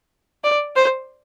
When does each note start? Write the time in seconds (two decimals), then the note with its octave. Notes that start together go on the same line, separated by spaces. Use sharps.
0.44 D5
0.76 C5